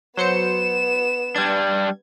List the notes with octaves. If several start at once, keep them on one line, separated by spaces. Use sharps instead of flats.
F#3 B3 C5 C#7 E7
G3 D4 G#6